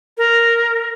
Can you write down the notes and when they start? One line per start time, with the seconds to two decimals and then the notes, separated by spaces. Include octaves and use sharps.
0.18 A#4